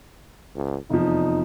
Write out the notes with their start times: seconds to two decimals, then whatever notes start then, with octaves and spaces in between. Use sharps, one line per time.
0.55 C#2
0.90 F1 E2 F3 D#4